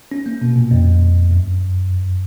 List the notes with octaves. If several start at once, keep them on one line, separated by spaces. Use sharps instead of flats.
C#4
A#3
B2
A#2
F2
F#2